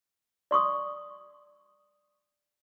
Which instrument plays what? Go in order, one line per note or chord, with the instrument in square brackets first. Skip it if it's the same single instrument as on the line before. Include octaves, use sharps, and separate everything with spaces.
[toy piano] D5 C6 C#6 D#6